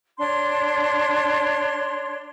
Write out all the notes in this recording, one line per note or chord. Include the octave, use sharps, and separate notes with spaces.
D4 C#5 C6